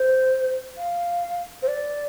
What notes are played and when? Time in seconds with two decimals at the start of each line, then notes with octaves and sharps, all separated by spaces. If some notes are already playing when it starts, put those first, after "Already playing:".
Already playing: C5
0.77 F5
1.62 C5
1.67 D5